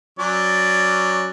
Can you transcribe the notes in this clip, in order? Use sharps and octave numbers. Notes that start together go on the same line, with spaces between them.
F#3 C#4 D5